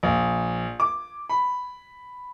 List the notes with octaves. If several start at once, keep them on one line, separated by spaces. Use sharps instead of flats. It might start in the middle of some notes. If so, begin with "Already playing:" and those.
A#1
D6
B5